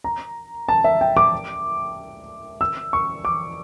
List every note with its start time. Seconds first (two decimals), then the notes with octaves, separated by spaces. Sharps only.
0.04 A#5
0.69 A5
0.84 E5
1.01 G5
1.17 D6
2.61 E6
2.93 C#6
3.25 D6